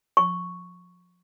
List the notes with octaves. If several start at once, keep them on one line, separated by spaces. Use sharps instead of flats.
C#6